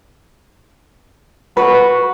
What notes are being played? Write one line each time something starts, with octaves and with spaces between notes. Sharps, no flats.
F#4 B4